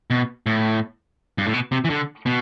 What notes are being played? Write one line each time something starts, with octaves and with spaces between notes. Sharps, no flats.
B2
A2
G2
A2
B2
C3
E3
D3
B2